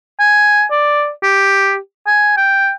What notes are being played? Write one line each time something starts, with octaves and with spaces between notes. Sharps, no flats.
G#5
D5
G4
G#5
G5